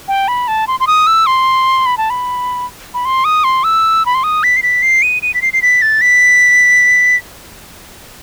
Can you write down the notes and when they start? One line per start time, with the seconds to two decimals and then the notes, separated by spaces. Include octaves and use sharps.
0.08 G5
0.28 B5
0.48 A5
0.67 C6
0.80 C6
0.87 D#6
1.07 E6
1.26 C6
1.86 B5
1.98 A5
2.10 B5
2.94 B5
3.05 C6
3.25 D#6
3.44 C6
3.64 E6
4.06 B5
4.15 C6
4.24 D#6
4.43 B6
4.57 C7
4.63 B6
4.82 C7
5.03 D#7
5.22 D#7
5.34 B6
5.42 C7
5.53 C7
5.62 B6
5.82 A6
6.01 B6